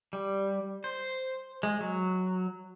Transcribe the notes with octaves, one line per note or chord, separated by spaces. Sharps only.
G3
C5
G#3
F#3